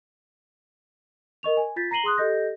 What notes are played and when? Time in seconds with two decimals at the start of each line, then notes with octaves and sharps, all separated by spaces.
1.43 A#4 D#5 C#6 F7
1.57 G#5
1.76 F4 G6 A6 B6
1.91 A#5 A#6 C7 D#7 F#7 G7
2.04 G#4 C6 D#6 F#6
2.18 G4 A4 D#5 G6 A#6